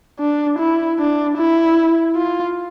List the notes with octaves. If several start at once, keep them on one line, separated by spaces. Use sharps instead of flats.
D4
E4
D4
E4
F4